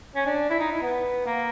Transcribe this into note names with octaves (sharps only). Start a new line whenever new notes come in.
C#4
D4
E4
D#4
E4
B3
A#3